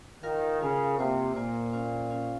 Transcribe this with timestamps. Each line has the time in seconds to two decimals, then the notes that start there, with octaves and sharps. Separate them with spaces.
0.23 D#3 F4 A#4 F5
0.61 C#3 F4 A#4 F5
0.98 C3 A#3 F4 C5
1.35 A#2 A#3 F4 C5
1.73 C#4 F4 C5 F5
2.10 C#4 F4 C5 F5